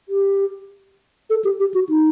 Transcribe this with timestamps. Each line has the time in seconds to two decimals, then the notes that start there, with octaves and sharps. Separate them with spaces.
0.09 G4
1.30 A4
1.44 G4
1.60 G4
1.74 F#4
1.89 D#4